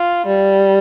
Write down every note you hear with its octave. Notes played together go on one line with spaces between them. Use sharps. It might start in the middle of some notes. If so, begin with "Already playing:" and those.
Already playing: F4
G3